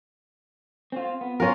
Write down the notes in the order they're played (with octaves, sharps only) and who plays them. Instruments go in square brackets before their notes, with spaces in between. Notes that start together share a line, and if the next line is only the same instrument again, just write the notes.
[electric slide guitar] C4 F4
B3
[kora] C#4 F4 A#4